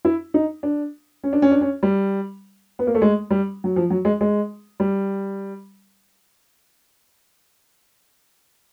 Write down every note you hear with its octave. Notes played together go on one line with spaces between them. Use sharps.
E4
D#4
D4
C#4
D4
C#4
D4
C#4
G3
B3
A#3
A3
G#3
G3
F#3
F3
F#3
G#3
G#3
G3